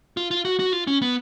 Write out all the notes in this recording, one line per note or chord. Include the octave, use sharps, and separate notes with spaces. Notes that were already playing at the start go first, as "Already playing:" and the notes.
F4
F4
F#4
F#4
F4
C#4
B3